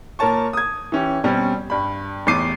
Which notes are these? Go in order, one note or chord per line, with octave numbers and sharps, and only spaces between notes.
A#2 A#4 C#5 A5 C#6
D#6 G#6
E3 C#4 G4
B2 G3 C4 C#4
G2 B5
A1 E2 D6 C7 D#7